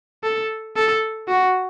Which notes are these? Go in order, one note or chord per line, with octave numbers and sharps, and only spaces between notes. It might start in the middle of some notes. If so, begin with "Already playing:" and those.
A4
A4
F#4